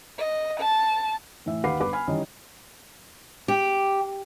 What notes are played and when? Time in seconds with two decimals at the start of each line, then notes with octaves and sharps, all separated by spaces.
0.18 D#5
0.61 A5
1.46 A2 E3 E5
1.64 D#2 B4 F5 F#5 D6 C7
1.80 G1 B4 D6
1.93 G#5 B5 F6
2.08 D#3 E3 G3 C#4 D#5
3.48 G4